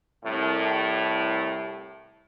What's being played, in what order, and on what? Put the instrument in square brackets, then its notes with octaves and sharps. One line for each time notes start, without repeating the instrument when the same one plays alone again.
[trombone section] C2 A2